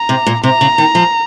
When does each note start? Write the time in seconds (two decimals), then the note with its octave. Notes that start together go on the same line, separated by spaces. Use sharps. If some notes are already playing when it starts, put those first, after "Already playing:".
Already playing: A#5
0.09 C3
0.26 A#2
0.43 C3 A#5
0.61 C#3
0.78 D#3
0.95 F3